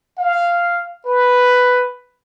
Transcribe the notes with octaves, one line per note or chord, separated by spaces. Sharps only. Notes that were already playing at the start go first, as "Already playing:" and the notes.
F5
B4